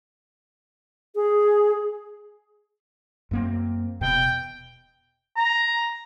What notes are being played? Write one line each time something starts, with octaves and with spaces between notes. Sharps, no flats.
G#4
F#2 A#3 C4
E1 B2 G5
A#5